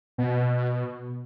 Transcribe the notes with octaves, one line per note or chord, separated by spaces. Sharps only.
B2